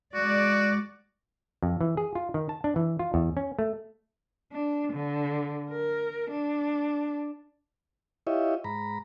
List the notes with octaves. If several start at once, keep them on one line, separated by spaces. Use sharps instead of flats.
G#3 F#4 D5
F2
E3
G#4
F4
D#3
A5
D4
E3
F4
E2
C#4
A3
D4
D3
A#4
D4
E4 F4 G4 C#5 D#5 E5
G#2 A#5 B5